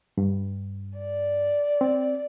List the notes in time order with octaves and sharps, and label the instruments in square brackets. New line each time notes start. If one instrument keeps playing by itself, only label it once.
[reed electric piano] G2
[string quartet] D5
[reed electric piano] C4